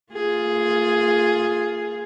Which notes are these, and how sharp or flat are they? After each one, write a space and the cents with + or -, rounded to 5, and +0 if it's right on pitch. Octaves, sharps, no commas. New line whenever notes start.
A#3 -40 F4 +5 G#4 +0